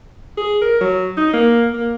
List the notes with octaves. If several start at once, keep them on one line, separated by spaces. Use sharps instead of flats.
G#4
A#4
F#3
D#4
A#3
A#3